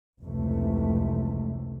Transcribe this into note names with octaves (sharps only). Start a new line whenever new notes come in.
F1 C#2 C3 E3 A3